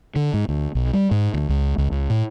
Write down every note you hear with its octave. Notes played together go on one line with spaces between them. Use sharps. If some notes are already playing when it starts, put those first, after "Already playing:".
D3
G#2
D2
B1
G3
G#2
D2
C#2
C#2
C#2
A2